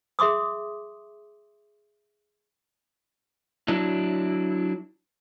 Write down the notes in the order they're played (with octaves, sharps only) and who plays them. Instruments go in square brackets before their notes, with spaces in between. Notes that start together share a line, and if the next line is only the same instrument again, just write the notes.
[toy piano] G#4 E5 C6 D6 D#6
[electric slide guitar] F#3 D4 E4